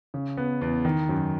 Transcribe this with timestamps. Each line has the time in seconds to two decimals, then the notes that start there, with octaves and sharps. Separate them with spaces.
0.14 C#3
0.37 B3
0.61 E2
0.85 D#3
1.09 F#2